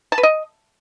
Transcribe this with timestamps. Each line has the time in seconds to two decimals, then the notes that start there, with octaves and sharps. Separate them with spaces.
0.12 A5
0.18 B4
0.23 D#5